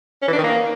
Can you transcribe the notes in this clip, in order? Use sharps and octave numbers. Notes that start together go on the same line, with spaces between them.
C#4
E3
D4
D#3
A#3